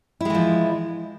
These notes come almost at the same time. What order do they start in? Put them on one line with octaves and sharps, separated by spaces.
E4 G#3 E3 F3